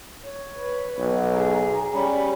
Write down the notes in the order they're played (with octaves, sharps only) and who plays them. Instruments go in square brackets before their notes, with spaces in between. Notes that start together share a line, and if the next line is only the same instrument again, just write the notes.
[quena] C#5
[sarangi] B4
[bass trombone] B1
[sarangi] G#4 [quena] A#5
[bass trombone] G3 [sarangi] C#4 [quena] B5